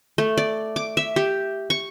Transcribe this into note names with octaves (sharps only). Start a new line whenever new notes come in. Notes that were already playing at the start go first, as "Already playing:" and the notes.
A3
D5
D6
E5
G4
C#6